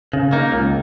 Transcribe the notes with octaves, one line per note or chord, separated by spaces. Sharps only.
C#3
A#3 D#4
C#2